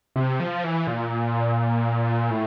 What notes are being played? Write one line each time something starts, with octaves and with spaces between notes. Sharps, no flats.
C3
F3
E3
A#2
A2